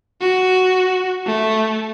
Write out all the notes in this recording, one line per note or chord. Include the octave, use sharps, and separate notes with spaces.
F#4
A3